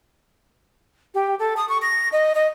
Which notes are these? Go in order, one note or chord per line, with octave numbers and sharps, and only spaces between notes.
G4
A4
D#6
C#6
A#6
D#5
D#5